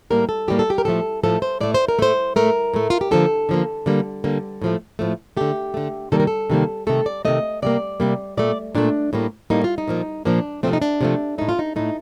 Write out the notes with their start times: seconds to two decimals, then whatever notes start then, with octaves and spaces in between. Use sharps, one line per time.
0.10 A2 G3 A#3 A#4
0.29 A4
0.48 A2 G3 A#3 G4
0.59 A4
0.70 G4
0.78 A#4
0.85 A2 F3 A3 A4
1.23 A2 F3 A3 A4
1.42 C5
1.61 A2 A3 D5
1.74 C5
1.88 A#4
1.99 A2 A3 C5
2.36 A2 A3 A#4
2.74 A2 A3
2.90 F4
3.01 G4
3.11 D3 F3 A#3 A4
3.49 D3 F3 A#3
3.86 D3 G3 A#3
4.24 D3 G3 A#3
4.62 A2 F3 A3
4.99 A2 F3 A3
5.37 D3 A3 G4
5.74 D3 A3
6.12 C3 D#3 G3 A#3 A4
6.20 A#4
6.27 A4
6.50 C3 D#3 G3 A#3
6.87 C3 D#3 A3 A4
7.06 D5
7.25 C3 D#3 A3 D#5
7.62 C3 G3 A#3 D5
8.00 C3 G3 A#3
8.37 A#2 A3 D5
8.75 A#2 A3 D4
9.13 A2 G3 A#3
9.50 A2 G3 A#3 D#4
9.64 F4
9.78 D#4
9.88 A#2 F3 A#3
10.25 A#2 F3 A#3 D4
10.63 C3 F3 A3 C4
10.73 D#4
10.82 D4
11.01 C3 F3 A3
11.38 A2 A3 D#4
11.49 F4
11.59 D#4
11.76 A2 A3 D#4